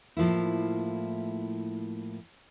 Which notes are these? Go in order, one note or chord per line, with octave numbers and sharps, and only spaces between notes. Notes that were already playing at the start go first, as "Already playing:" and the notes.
A2 F3 A#3 E4